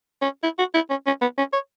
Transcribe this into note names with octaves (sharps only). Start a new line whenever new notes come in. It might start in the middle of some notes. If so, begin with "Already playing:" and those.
C#4
E4
F#4
E4
C#4
C#4
B3
C#4
C#5